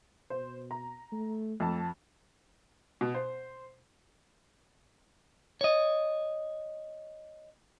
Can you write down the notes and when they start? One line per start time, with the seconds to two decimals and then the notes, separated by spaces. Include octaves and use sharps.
0.30 B2 C5
0.71 A#5
1.12 A3
1.60 F2 A3 A5
3.01 B2
3.14 C5
5.61 C#5 D#5